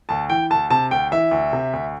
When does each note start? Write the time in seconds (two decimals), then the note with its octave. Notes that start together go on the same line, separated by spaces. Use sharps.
0.09 D2 A5
0.29 E3 G5
0.50 D2 A5
0.70 C3 A5
0.91 D2 G5
1.12 E3 E5
1.31 D2
1.53 C3
1.73 D2